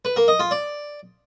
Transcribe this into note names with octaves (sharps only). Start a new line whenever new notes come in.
B4
A#3
D#5
F4
D5